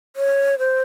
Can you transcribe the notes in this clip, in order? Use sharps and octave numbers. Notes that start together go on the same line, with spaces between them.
C#5
C5